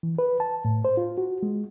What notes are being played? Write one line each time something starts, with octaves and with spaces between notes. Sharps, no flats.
E3
B4
A5
A2
C5
F4
F#4
G#3